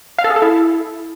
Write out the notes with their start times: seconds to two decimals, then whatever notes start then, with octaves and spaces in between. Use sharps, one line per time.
0.18 F5
0.24 A4
0.30 G#4
0.36 A4
0.42 E4